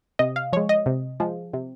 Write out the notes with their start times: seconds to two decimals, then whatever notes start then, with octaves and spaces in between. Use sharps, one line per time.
0.19 C3 D#5
0.36 F5
0.53 F3 G#3 C#5
0.69 D#5
0.86 C3
1.20 F3 G#3
1.53 C3